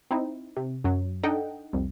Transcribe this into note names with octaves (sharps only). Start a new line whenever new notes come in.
C4 D#4 E4
C3
F#2 F#3
D4 D#4 A4 D#5 F#5 G5
C2 F2